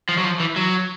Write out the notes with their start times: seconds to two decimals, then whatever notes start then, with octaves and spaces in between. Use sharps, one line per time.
0.09 F3
0.18 F#3
0.24 F3
0.40 E3
0.56 F#3